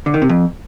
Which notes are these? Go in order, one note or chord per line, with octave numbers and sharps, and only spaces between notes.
D3
D#3
C3
F2